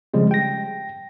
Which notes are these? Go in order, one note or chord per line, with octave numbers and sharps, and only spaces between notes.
C#3 F3 G3 G#3 C4
G5 A#6